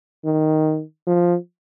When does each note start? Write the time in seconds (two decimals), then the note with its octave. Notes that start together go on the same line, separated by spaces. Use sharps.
0.25 D#3
1.07 F3